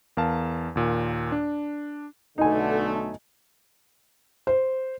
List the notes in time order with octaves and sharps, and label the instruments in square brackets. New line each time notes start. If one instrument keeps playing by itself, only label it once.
[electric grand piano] E2 A#4 F5 A5
D#2 A#2
D4
[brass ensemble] B1 D3 A3 [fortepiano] D#4 G#5
[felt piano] C5